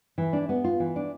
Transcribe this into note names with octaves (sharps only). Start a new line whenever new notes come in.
E3
D4
B3
F4
E3
D4